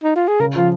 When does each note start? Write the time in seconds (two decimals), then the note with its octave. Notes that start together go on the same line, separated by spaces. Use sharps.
0.04 D#4
0.16 F4
0.28 G#4
0.40 C#3 A#4
0.56 F3 F4